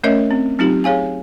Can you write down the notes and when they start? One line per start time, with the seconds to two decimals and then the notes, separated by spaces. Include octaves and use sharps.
0.04 A3 C#4 A#4 C#5 D#5 E5
0.31 C4
0.59 F#3 C4 D#4 F4 G4
0.84 G#4 C#5 F5 G#5